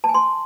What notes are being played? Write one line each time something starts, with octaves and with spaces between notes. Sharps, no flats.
A5
G#5
C6